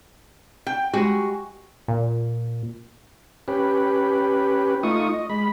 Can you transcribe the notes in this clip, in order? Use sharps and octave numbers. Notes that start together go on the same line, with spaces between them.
G5
G3 G#3 F#4
A#2
C#4 G4 B4
A3 D#4 F4 C#6 D#6
D#5
G#3 B5